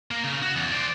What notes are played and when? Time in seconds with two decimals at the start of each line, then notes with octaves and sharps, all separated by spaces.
0.11 A#3
0.24 C#3
0.42 F#4
0.56 E2
0.72 C5 D5